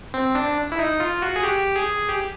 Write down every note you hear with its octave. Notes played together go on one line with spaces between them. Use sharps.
C4
D4
E4
D#4
F4
F#4
G#4
G4
G#4
G4